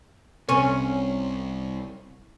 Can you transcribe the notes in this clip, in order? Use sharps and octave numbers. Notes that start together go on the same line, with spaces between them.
C2 C3 C#4